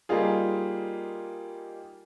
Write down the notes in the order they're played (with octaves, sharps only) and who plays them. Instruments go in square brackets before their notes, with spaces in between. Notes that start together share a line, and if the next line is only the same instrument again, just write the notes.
[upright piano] G3 A#3 D#4 F4 G#4